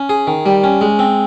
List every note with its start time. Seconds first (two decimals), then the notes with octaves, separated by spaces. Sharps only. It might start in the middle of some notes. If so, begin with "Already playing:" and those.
Already playing: C#4
0.09 G#4
0.27 D#3
0.46 G3
0.64 C#4
0.81 G#3
0.99 C4